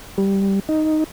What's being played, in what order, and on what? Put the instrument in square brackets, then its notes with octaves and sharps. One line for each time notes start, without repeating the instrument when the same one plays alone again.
[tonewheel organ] G3
D#4